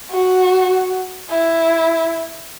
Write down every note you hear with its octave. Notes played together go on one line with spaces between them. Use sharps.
F#4
E4